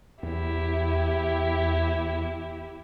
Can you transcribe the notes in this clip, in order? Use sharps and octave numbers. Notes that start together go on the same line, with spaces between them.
E2 E4 G4